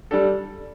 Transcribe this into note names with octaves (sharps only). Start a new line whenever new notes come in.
G3 D4 A4